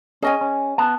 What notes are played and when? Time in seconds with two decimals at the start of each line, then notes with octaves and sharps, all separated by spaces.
0.22 C#4 G#4 D#5 G#5
0.41 C#4
0.78 B3 A5